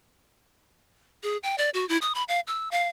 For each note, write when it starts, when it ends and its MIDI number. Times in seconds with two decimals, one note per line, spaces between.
1.23 1.37 68
1.43 1.56 79
1.58 1.70 74
1.74 1.87 66
1.89 1.98 64
2.02 2.13 87
2.15 2.23 83
2.28 2.40 77
2.47 2.69 88
2.71 2.88 77